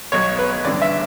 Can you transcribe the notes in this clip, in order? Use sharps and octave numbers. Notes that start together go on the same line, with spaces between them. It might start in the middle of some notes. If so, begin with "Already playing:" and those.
B1 B2 C#5
B4
A1 G2 D3 D5
E5